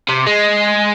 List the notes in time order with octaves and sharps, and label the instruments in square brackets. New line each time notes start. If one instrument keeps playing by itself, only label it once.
[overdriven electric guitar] C3
G#3